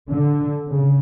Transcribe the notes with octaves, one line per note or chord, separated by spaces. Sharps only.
D3
C#3